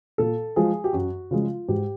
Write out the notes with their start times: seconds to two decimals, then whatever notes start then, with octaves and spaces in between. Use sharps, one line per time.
0.18 A#2 A4
0.56 F3 G#3 G#4
0.84 G4
0.93 F#2 F#4
1.31 C#3 F3 G#3 F4
1.68 G#2 G4